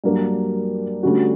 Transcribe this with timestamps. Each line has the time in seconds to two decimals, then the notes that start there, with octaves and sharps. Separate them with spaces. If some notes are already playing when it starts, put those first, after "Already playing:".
0.04 G2 F#3 A#3 D4 A#4
1.03 D2 D3 G3 C#4 F#4